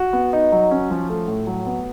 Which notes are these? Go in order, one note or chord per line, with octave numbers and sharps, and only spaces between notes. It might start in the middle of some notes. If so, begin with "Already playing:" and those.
Already playing: F#4
B3
D#4
F#3
C#4
F3
A3
A2
F#3
B3